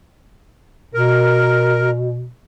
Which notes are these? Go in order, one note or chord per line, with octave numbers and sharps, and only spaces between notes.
B2 A#4